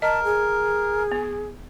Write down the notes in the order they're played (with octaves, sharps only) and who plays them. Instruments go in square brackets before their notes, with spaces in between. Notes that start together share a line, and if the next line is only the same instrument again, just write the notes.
[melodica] A#4 [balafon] D#5 [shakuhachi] A5
[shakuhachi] G#4
[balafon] B3